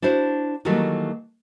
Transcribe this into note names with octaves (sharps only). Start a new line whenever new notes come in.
D4 E4 F#4 C5
D#3 E3 F#3 G3 A3 A#3